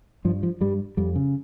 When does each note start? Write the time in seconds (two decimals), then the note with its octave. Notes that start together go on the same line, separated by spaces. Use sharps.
0.25 G2 F3
0.43 F3
0.61 G2 G3
0.97 F2 G3
1.16 C#3